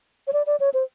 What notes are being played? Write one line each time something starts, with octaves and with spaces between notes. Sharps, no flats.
C#5
D5
D5
C#5
C5